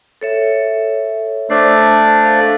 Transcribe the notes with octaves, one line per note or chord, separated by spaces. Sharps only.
A4 C#5 E5
A3 D4 C5 D5
A4 F5